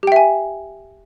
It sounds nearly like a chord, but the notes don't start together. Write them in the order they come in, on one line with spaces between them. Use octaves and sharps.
G4 G5 E5 G#5